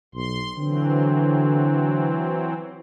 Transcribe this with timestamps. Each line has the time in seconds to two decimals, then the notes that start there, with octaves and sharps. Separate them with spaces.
0.15 B1 C6
0.58 D3 E3 F#3 C4